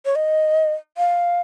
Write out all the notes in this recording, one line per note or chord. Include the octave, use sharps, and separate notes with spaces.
C#5
D#5
F5